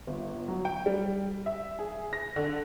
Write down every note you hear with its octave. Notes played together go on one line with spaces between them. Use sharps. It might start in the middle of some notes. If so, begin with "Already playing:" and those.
G1
F#3
G5
G3
E5
G#4
A#6
D3